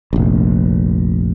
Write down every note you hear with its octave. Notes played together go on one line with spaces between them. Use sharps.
F1 A#1